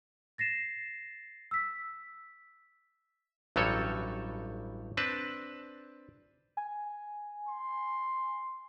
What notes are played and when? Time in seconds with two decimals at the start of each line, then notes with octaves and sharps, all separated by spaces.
0.38 A6 A#6 C7 E7
1.51 E6 B6
3.56 A1 G2 F#3 G3 A4 C#5
4.97 C4 D4 B4 A5
6.57 G#5
7.48 C6